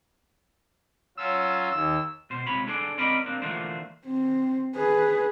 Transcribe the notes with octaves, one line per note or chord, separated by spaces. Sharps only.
F#3 C#4 F4 E6
D#2 E6
B2 C5
C#2 C3 C#5 B5
D4 G#4 A4 D5
C4 C#4 A#4 D5 D#5 B5
A#3 C4 D4
D3 E3 F3 A3 A#3 C5
C4
G#4 B4